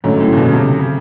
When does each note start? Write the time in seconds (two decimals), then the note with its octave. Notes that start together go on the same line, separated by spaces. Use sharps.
0.04 G#2 D3 F#3 A3 C#4
0.20 A2
0.33 A#2
0.37 B2
0.45 C#3
0.53 C3
0.79 C#3